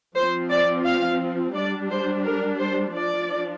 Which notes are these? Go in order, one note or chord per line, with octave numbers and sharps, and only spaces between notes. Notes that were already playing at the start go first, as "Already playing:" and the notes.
F3 C4 C5
D5
F5
G3 D4 D5
C5
A#4
C5
F3 D4 D5